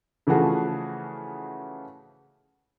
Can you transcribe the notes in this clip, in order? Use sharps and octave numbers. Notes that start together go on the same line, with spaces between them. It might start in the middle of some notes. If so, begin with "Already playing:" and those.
C#3 E3 F3 A3 F#4 G#4